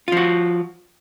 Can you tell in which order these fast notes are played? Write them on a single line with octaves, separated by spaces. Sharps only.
F4 F3 F#4